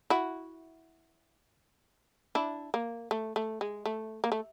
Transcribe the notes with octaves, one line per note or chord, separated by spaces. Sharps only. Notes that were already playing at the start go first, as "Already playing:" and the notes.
E4 F#4
D4 E4
A#3
A3
A3
G#3
A3
A#3
A3